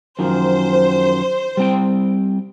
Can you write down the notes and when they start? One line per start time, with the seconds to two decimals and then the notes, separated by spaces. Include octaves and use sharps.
0.19 F#2 D#3 F3 C5
1.57 G3 C4 G5